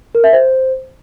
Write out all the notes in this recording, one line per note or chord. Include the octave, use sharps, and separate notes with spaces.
A#4
E5
C5